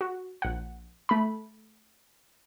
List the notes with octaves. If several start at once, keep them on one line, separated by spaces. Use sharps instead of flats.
F#4
A#1 F#5
A3 B5